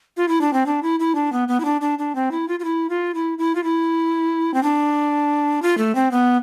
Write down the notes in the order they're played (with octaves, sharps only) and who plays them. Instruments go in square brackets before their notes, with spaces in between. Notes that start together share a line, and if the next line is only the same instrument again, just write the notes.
[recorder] F4
E4
D4
C4
D4
E4
E4
D4
B3
B3
E4
D4
D4
D4
C4
E4
F4
F4
E4
F4
E4
E4
F4
E4
C4
D4
F4
A3
C4
B3